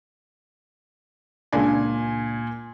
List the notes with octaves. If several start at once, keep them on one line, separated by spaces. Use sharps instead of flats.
C#2 A#2 D4 G#5